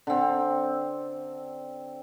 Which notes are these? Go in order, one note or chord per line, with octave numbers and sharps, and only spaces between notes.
D3 C4